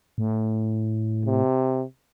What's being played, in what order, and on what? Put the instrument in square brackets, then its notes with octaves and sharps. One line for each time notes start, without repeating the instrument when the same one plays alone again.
[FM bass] A2
[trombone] C3